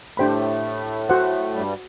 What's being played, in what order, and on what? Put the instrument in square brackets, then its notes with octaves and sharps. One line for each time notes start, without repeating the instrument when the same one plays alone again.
[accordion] A2 A3 [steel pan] D4 G4 C5 G5 B5
[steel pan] F#4 C5 F#5
[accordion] G2 G3